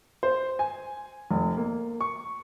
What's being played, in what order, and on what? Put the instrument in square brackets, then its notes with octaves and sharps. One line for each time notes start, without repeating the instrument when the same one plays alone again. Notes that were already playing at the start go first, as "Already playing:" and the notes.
[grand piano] C5
G#5
F1
A#3
C#6